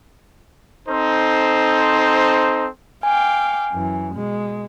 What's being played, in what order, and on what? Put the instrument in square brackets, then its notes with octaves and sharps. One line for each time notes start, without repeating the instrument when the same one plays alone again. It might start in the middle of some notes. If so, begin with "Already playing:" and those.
[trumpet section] C4 D#4 A4 C5
[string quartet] F5 G5 D6 [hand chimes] G#5
[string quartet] F#2 E3
B2 G#3